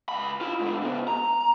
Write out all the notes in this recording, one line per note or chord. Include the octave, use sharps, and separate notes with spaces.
C#2 B5
F4 B5
G#2 D3
C#3 B3
A#5